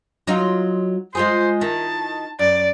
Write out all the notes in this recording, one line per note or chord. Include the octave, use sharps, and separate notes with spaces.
F#3 D#4 F4
G#3 F4 G#4 C5
D#3 E4 A5
F#2 D5